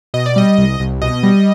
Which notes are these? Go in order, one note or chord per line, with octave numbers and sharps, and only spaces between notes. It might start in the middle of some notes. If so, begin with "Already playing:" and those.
B2 D#5
D5
G3 D#5
C2
C2
B2 D#5
G3